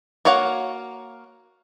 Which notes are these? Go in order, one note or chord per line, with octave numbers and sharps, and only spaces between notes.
A#3 F#4 C#5 F5 F#5